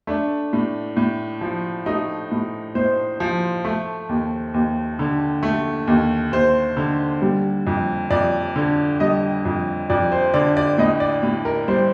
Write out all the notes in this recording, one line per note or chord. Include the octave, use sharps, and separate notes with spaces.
A3 D4
A2
A2
F3
A3 D#4
A2
A2 C5
F3
A3
D#2
D#2
D3
A3
D#2
D#2 C5
D3
G3
F2
F2 D5
D3
G3 D#5
F2
F2 D5
C5
D3 D5
D5
A2 D#5
D5
A2
A#4
G3 C5